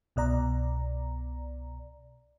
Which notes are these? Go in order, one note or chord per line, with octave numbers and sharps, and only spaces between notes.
C2 B2 D5 A#5